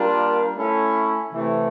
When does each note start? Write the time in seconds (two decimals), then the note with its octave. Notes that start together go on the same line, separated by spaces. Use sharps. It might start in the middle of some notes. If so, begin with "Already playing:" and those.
Already playing: G3 A#3 D4 F4 A#4
0.57 A3 C#4 E4
1.32 C3 E3 A3